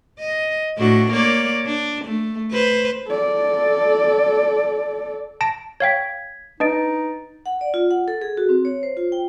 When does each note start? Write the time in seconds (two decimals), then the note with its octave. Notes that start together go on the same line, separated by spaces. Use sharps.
0.19 D#5
0.78 A2 D4 F#4
1.12 A#3 C#5 D5
1.65 D4
2.05 A3
2.52 B4 C5
3.08 A4 D5
5.41 A5 A#6 D7
5.80 C#5 F5 G5 G#6 B6
6.60 D4 D#4 B4 D#5 A6 D7
7.46 F#5
7.61 D5
7.74 F4
7.91 F#5
8.08 A4
8.21 G#4
8.37 F#4
8.49 C4
8.65 C#5
8.83 C5
8.97 F4
9.12 G5